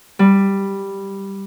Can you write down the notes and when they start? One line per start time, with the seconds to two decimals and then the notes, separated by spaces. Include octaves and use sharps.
0.19 G3